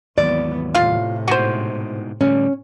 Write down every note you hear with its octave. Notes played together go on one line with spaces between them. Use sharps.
G#1 D#2 E3 F#3 B3 D5
A2 C3 F4 F5
G#2 B2 F#4 C5
A2 D3 G3 C#4